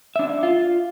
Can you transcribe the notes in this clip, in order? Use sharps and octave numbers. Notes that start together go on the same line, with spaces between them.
D4 E5
F4